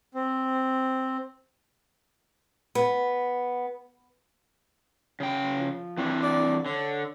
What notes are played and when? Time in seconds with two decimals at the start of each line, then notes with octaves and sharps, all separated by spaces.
0.15 C4
2.75 B3
5.20 C#3 G5
5.58 F3
5.97 E3 C4 D4
6.23 D5
6.66 D3 C#5